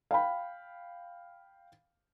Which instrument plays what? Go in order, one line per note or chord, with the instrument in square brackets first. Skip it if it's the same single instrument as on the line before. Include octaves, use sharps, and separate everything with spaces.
[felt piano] F5 G5 B5